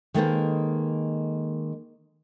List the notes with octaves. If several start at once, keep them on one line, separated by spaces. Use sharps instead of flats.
D#3 G#3 A#3 A4 B4 C5